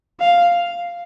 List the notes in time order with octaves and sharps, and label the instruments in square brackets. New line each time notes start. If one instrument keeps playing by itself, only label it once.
[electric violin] F5